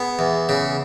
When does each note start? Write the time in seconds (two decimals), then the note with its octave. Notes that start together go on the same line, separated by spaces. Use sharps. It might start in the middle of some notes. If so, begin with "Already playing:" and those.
Already playing: B3 G#4
0.19 E2
0.49 C#3